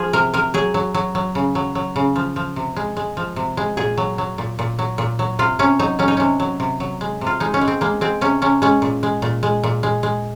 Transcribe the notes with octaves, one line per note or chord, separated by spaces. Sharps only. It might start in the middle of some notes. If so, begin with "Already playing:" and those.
Already playing: F3 G#4
C3 A#4
C3 A#4
F#3 G#4
F#3
F#3
F#3
C#3
F#3
F#3
C#3
F3
F3
C3
G#3
G#3
F3
C3
G#3
A#2 G#4
F#3
F#3
A#2
A#2
F#3
A#2
F#3
C3 F4
C3 C#4
F#3 D#4
F#3 C#4
D#4
C3 C#4
F#3
C3
F#3
G#3
C3
F4
G#3 D#4
C#4
G#3
C4
G#3 A#3
G#3 C4
C3 C#4
C3 C#4
G#3 C#4
A#2
G#3
A#2
G#3
A#2
G#3
G#3